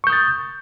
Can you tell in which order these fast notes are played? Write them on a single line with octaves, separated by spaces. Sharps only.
C#6 G6 D#6 A6